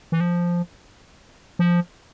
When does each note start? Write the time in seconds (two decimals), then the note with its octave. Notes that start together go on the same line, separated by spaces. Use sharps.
0.12 E3
0.20 F3
1.59 F3